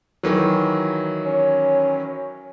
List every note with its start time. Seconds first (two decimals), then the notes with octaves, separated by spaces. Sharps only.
0.23 D#3 E3 F#3
1.26 C#4